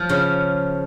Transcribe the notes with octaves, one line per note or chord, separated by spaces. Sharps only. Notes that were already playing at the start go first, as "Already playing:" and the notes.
Already playing: F3
C#3